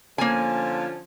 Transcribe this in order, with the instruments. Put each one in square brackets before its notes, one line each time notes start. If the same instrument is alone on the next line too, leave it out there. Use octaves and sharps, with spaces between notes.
[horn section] D3 F3 C#4 [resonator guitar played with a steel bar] A#3 G#5